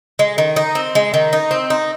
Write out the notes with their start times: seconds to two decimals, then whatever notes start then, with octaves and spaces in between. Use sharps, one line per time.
0.19 G#3
0.38 D#3
0.56 D#4
0.75 C4
0.95 G#3
1.14 D#3
1.33 D#4
1.51 C4
1.70 D#4